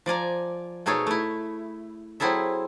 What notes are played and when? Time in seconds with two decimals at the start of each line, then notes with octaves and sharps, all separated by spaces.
0.06 F3 D5 G#5 A#5
0.86 B2 A3 D#4 G#4 A4 C#5
1.07 A3 E4
2.20 F#3 C4 E4 G#4 A4 E5